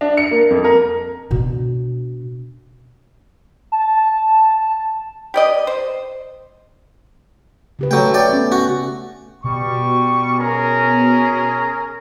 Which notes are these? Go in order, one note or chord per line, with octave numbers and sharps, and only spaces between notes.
D4
C#7
A#3
F2
A#4
B2 D4
A5
G4 D5 D#5
C5
C#3 G4 B4
F#3 A3 A4 G5
D5 G5
B3 C#4
F#4
B2 G3 C#6
C#4 G#4 A#4